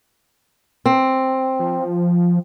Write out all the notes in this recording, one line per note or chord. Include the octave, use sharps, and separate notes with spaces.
C4
F3